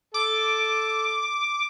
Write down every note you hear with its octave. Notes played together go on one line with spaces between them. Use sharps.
A4 D6